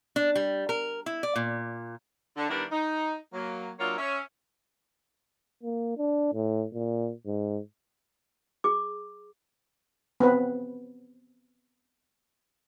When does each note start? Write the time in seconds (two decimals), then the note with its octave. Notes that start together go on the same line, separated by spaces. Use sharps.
0.16 D4
0.35 G3
0.69 A#4
1.06 E4
1.23 D5
1.36 A#2
2.36 D3
2.49 D#3 G3 B3 D4 E4 A#4
2.71 D#4
3.33 F#3 A#3
3.80 F#3 A#3 D4 F4 C#5 E5
3.98 C#4 E5
5.63 A#3
5.98 D4
6.33 A2
6.74 A#2
7.26 G#2
8.64 G#4 D6
10.20 B3 C4 B4